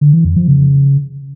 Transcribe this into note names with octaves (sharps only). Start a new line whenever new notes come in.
D3
E3
F2
F3
C#3